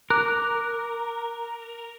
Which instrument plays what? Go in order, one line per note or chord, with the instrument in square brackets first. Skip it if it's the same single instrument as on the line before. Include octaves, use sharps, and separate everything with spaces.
[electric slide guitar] A#4 [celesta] D6 F#6